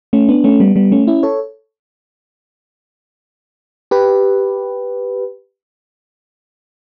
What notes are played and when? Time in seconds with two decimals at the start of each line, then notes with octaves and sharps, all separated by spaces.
0.13 A3 C#4
0.29 B3 D4
0.44 A3 C#4
0.60 G3 B3
0.76 G3 B3
0.92 A3 C#4
1.07 C#4 E4
1.23 A4 C#5
3.91 G4 B4